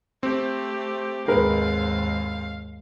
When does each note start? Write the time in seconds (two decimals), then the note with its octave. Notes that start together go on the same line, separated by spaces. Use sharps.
0.23 A3 C4 G4
1.28 D#2 G#2 G#3 A#4 B4 F5